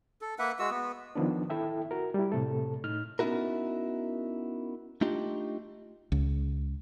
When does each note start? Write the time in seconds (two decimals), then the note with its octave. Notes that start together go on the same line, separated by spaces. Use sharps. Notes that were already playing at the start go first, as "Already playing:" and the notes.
0.21 A4
0.39 A#3 B4 E5 F#5
0.59 G#3 F#4 E6
0.70 B3
1.15 D#3 F3 B3 D4
1.50 E4 A4 E5 G5
1.91 F#4 A#4
2.14 G3 E4
2.32 A2 C3 A3 A4
2.84 A2 D#4 F6
3.19 B3 C#4 D#4 E4 F#4 A#4
5.01 A3 D4 D#4 F4 G4
6.12 C#2